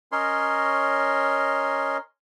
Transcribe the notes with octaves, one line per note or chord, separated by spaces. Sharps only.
C#4 A#4 C#5 D#5 C6